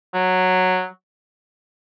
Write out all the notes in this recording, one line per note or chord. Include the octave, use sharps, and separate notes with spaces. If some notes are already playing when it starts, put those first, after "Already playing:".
F#3